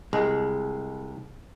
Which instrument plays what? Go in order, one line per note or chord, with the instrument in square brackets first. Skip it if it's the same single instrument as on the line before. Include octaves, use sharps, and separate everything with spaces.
[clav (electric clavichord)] C2 [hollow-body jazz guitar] G#3